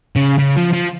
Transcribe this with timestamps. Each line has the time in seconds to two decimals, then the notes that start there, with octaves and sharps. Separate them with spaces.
0.16 C#3
0.39 C#3
0.57 F3
0.73 F3